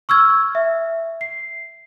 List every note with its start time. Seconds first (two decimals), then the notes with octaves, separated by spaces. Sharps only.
0.09 C#6 E6 F6 G#6
0.55 E5
1.21 C7